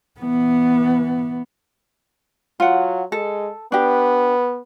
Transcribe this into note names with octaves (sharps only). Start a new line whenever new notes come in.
E3 B3
F#3 F4 F#5
G#3 A4
B3 D4 G4